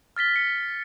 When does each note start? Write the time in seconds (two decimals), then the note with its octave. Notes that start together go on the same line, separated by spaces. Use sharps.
0.16 F6 A6 B6 G7
0.36 C#7